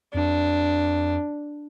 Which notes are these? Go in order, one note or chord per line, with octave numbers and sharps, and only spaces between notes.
F2 D4